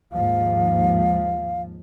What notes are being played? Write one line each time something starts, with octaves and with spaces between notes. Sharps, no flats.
D#2 G#2 F3 F5